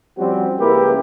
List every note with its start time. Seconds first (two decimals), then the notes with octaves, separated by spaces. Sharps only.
0.17 F3 G3 C4 C#4 F#4 G4
0.59 C#2 A#3 E4 G4 A#4 B4